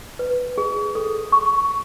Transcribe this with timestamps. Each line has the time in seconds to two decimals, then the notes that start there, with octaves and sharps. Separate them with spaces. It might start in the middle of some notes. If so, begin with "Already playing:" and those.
0.19 B4
0.58 G#4
0.95 A4
1.32 C#6